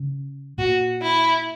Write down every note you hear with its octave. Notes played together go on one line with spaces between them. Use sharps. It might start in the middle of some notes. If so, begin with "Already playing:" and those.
Already playing: C#3
A#2 F#4
E4